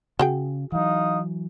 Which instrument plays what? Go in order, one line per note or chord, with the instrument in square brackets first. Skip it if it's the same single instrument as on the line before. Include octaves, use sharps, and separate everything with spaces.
[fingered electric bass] C#3 [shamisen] F#4 G#4 G5
[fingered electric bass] E3 F#3 [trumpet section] D#4 F5 D#6